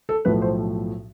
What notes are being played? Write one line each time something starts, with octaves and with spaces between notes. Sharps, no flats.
A4
B1 A2 F3 A3 B4
C5